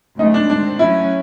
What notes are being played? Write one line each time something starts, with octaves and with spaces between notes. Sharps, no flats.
D2 C#3 F#3 A3 D#4
D4
D#3 G#3 C4 D4
F#3 A3 C#4 E4